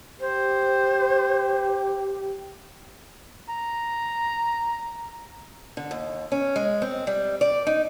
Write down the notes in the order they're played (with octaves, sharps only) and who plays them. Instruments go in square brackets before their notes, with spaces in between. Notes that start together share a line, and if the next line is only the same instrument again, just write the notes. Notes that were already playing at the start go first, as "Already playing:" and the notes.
[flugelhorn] G4 [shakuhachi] C5
[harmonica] A#5
[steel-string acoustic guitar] D3
D#2
C#4
G#3
C4
G3
D5
D#4